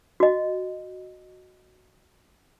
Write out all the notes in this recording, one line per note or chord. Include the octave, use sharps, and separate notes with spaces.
F#4 D#5